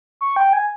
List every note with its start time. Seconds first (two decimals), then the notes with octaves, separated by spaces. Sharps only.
0.21 C#6
0.36 G5
0.53 G#5